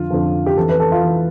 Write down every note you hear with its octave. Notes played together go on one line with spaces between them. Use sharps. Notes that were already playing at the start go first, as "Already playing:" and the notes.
Already playing: F2 D3 F3 F4
F2 D3 F3
G4
F2 E3 A4
B4
A4
F4
E3